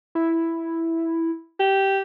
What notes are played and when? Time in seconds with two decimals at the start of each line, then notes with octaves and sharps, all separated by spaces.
0.15 E4
1.60 G4